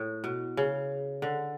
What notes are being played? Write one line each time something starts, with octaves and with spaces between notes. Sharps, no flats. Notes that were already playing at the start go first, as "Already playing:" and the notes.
Already playing: A2
B2
C#3
D3